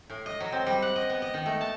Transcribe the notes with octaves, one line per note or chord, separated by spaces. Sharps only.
A2
D#5
F#3
C4
G3
F#5
D#5
B3
D#5
D#3
A3
A5